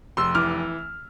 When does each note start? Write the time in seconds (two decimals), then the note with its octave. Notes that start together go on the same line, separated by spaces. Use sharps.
0.17 F1 C6 E6
0.35 E3 D6 F6